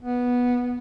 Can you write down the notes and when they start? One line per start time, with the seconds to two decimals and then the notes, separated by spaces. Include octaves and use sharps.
0.03 B3